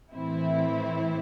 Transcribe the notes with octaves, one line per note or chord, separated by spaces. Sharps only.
A2 E3 C4 E4